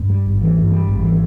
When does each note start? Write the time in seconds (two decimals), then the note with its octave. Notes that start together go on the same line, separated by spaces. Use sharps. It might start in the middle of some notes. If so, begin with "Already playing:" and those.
Already playing: G2
0.09 G3
0.26 G#1
0.41 E3
0.57 G2
0.71 G3
0.88 G#1
1.03 E3